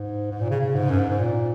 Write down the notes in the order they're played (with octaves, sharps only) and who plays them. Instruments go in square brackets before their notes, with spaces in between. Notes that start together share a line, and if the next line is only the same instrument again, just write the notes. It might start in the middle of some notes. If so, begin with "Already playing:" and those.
Already playing: [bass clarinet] G#2
G#2
A#2
C#3
C#3
G#2
F#2
G#2
G#2
A#2